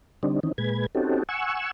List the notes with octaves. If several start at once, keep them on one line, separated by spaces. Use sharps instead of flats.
D3 G3 C4 D4 D#4
D#3 E3 C4 C#4 D#4
A#2 G#3 B4 G#6
C4 C#4 D#4 F#4 G4 A4
F#5 G#5 C#6 E6